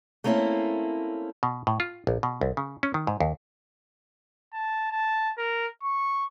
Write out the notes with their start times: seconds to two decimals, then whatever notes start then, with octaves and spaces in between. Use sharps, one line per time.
0.24 A3 A#3 C4 C#4 E4
1.43 B2
1.67 A2
1.80 F4
2.07 A#1
2.23 B2
2.41 C2
2.57 C#3
2.83 C#4
2.94 D#3
3.07 G#2
3.20 D#2
4.53 A5
4.91 A5
5.38 A#4
5.83 C#6